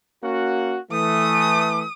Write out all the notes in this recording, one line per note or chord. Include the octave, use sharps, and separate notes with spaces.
A#3 C#4 F#4
E3 A3 D#6